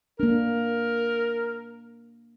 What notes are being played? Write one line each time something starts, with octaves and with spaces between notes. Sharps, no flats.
A#3 D4 A#4